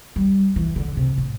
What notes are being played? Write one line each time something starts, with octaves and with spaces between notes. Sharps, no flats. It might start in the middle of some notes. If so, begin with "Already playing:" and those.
G3
E3
D3
C3
A2